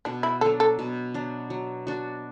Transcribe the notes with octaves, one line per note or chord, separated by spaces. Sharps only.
B2 D4
E4
F#3 D4 A4
A4
B2
F#3 D4
F#3
D4 F#4